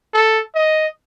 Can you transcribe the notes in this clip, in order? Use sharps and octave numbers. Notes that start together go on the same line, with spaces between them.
A4
D#5